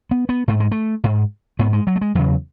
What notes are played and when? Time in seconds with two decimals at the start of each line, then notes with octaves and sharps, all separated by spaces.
0.11 B3
0.29 B3
0.48 G#2 A3
0.60 G#3
0.71 A3
1.04 G#2
1.59 G#2 B3
1.73 G#3
1.87 F#3
1.96 A3
2.01 G#3
2.15 E2 C#3 F#3